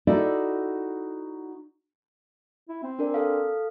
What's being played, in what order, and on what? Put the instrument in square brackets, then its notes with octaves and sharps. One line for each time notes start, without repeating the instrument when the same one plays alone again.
[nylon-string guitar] D#4 E4 F#4 A4 D5
[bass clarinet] E4
C4
[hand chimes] D4 A#4 D5
A4 F5